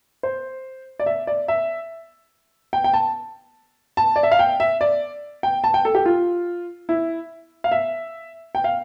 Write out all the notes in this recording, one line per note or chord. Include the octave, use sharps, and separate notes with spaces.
C5
D5
E5
D5
E5
G5
G5
A5
A5
D5
E5
F5
G5
E5
D5
G5
A5
G5
A4
G4
F4
E4
F5
E5
G5
F5